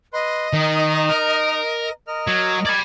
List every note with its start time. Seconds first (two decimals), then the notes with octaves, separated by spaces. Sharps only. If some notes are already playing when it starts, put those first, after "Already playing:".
0.13 B4 D#5 C6
0.53 D#3 D#4
1.09 A#4
2.07 A#4 D#5 F6
2.27 F#3 G#6
2.65 D5 B5 G#6